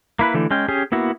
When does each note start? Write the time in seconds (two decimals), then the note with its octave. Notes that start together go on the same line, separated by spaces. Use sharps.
0.19 A#3 E4 B4
0.34 D3 E3 A3
0.51 G#3 C#4 G5
0.68 C#4 G4 G#4
0.92 A#3 B3 E4 F#4